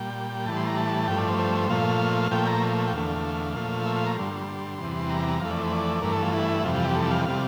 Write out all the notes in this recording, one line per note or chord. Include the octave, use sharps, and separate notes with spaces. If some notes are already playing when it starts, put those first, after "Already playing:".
Already playing: A#2 G3 G5
A2 E3 G3 A5
C6
A#5
A5
G2 F3 A3 G5
D5
C5
C5
A#2 F3 A3 F5
A#2 F3 A3 G5
A#5
G5
E2 D3 A3 F5
A#2 F3 A3
E5
F5
A#5
G2 D3 G3 C6
E2 C3 E3 G3
A#5
F2 E3 A3 F5
D5
C5
D5
G2 E3 A3 A#4
A4
F4
E4
F2 C3 E3 G3 F4
F4
G4
A4
F5
C3 G3 F5